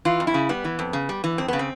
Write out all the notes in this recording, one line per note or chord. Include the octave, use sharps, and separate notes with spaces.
E3 F4
F2
E4
C#3
G3 B3
E3
F2
C#3
G3
E3
F2 C4
C#3 B3
C4